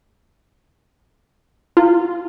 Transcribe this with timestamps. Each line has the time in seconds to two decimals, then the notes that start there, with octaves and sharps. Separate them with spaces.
1.77 E4 F4